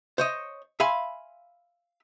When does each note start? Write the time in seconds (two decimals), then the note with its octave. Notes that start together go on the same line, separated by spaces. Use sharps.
0.18 C5 C#5 D#5
0.80 E5 F5 G#5 B5 C6